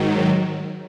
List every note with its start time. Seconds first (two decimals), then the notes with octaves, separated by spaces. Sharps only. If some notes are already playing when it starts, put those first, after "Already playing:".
Already playing: G#2 D#3 F#3